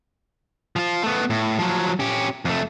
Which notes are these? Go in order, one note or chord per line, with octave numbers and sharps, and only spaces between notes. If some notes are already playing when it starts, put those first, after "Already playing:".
F3 F4
A3 B3
A2
F3 F#3
C#4 G4
F2 A3